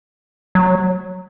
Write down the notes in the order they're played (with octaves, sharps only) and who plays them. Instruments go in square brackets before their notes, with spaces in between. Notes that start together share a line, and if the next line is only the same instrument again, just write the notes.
[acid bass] F#3